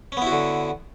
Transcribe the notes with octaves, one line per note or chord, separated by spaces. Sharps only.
D3 B3 C#4 E4 F#4